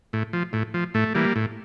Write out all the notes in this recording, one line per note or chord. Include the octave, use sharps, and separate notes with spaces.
A2
F3
A2
F3
A2 A3
E3 G3 A#3
A2